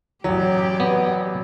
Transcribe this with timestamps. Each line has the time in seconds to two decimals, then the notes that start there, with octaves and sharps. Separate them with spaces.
0.24 A1 F#3 G4 D5
0.80 B3